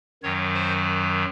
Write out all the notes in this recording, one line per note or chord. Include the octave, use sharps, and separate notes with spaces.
F#2 D#3 F#3 C#5
C5